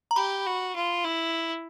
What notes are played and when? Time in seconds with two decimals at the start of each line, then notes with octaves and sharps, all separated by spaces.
0.11 A#5
0.16 G4 B5
0.46 F#4
0.76 F4
1.04 E4